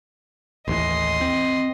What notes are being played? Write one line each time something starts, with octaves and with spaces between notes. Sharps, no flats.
A1 D#2 E3 D#5 C6
C4